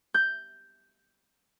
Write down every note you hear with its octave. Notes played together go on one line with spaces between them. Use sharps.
G6